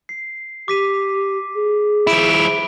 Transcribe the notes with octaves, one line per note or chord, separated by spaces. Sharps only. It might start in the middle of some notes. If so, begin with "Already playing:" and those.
C7
G4 D6 B6 D#7
G#4
F3 E4 B5 D7 E7